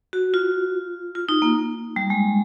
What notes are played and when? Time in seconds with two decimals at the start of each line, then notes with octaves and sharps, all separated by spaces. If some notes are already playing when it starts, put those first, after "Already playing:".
0.13 F#4
0.34 F4
1.15 F4
1.29 D#4
1.42 A#3
1.96 G3
2.10 G#3